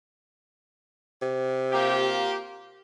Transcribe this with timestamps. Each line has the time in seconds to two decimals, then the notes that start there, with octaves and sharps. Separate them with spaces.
1.22 C3
1.71 A#3 F4 G4